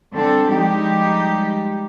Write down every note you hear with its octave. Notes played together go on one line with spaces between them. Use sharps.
D3 G3 C4 D4 A4
F3 G3 G#3 D#4 G4